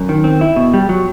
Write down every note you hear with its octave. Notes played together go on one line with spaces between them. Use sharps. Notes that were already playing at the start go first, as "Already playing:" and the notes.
Already playing: F#2
D#3
C4
E4
B2
G3
F#3